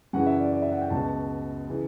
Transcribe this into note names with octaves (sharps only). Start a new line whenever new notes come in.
F#2 C#3 E3 F#5
E5
D5
D5
E5
F#5
G5
C#2 B2 A5
C#3 E3